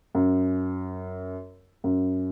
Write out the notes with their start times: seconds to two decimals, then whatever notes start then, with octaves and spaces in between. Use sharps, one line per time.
0.15 F#2
1.84 F#2